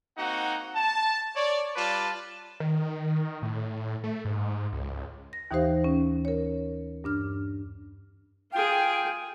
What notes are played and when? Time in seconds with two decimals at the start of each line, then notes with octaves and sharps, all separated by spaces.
0.18 A#3 C4 D#4 F#4 F#5
0.75 A5
1.36 C#5 D5
1.76 G3 F4 B4 D5 A5
2.60 D#3
3.42 A2
4.04 A3
4.25 G#2
4.73 C#2
5.33 A#6
5.51 D#2 E3 D#4 G4 C5 F5
5.84 C#4
6.25 A#4 C#5
7.04 G2 D4 F6
8.52 F4 G#4 G5